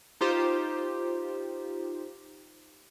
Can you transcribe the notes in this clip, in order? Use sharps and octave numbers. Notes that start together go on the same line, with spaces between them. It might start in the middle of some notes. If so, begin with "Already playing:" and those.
D#4 F4 G4 C5